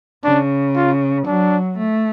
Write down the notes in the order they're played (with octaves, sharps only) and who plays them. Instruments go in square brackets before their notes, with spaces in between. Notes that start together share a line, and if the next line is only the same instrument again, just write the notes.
[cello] C#3 [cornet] D4
[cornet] F4
[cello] F#3 [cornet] D4
[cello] A3